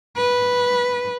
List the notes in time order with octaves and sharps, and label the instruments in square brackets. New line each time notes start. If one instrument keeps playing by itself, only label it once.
[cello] B4